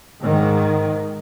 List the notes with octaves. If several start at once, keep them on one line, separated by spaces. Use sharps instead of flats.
G#2 D#3